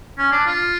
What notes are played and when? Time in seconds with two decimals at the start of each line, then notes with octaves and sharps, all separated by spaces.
0.18 C#4
0.32 D4
0.46 F4